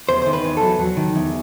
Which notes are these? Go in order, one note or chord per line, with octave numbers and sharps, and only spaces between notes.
E2 C5
D#3 C5
B4
E2
F#3 A4
F#3
D#3
E2